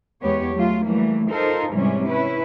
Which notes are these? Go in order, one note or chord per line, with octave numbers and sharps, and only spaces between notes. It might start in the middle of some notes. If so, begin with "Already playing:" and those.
E2 G#3 B3 G4 C#5
F#3 A3 F4
E3 F#3 G3 A3 A#3
D#4 F4 A4 A#4 C5
G#2 C3 E3 G3 G#3 C#4
C#4 E4 B4